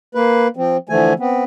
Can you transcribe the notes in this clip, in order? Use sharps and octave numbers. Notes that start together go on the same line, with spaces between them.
A#3 B4
F3 C4
D3 E3 F3 A3 G#5
B3 C4